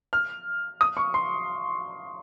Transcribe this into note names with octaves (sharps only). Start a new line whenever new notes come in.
F6
D#6
C#6
C6